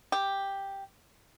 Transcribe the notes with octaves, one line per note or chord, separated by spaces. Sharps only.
G4